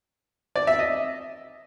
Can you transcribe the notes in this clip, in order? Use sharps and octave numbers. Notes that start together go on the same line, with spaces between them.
D5
E5
D#5